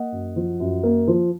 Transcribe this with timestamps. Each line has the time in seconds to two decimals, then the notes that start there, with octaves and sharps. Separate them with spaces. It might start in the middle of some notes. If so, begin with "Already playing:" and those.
Already playing: A#3 D#5 F#5
0.12 F#2
0.36 F3
0.60 F#2
0.83 A#3
1.07 F3